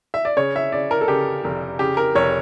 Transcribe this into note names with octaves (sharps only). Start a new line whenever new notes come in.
E5
D5
C#3 C#5
E5
C#3 D5
A#4
A4
C#3 G4
F1
C#3 G4
A#4
F1 C#5